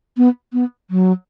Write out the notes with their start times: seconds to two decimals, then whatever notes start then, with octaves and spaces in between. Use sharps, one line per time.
0.17 B3
0.53 B3
0.90 F#3